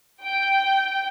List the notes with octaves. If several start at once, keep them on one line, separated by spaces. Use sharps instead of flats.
G5